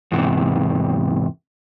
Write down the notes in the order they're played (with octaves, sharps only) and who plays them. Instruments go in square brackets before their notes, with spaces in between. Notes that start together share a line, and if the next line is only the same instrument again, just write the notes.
[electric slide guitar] E2 G#2 C3